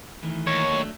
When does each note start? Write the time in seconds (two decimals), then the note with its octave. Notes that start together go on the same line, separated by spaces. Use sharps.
0.23 D#3 E3 A3
0.47 D#2 C#5
0.71 F#3 A3 D4